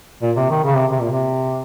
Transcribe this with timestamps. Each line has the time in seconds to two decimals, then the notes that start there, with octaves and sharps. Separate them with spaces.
0.22 A#2
0.37 C3
0.50 D#3
0.64 C#3
0.77 C3
0.91 C3
1.01 A#2
1.11 C3